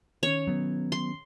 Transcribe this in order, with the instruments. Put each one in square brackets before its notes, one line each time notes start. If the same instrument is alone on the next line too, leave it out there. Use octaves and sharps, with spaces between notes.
[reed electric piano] D#3 C#4 [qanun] C#5
[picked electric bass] F#3 B3
[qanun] C6